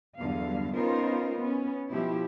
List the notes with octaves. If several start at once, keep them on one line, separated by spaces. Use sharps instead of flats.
E2 G2 D3 F#3 F5
B3 C#4 D#4 F4 A#4 C5
B3 C#4
B2 F3 E4 G4